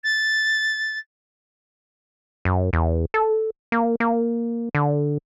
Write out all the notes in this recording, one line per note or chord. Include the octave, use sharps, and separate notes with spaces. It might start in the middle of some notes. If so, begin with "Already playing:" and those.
A6
F#2
E2
A4
A#3
A#3
D3